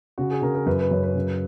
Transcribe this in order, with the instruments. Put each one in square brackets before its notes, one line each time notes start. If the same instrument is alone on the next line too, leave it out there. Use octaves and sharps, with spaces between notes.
[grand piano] C#3 F#4
G#4
C#3 A#4
A#4
F#2 B4
B4
F#2 C#5
B4
C#3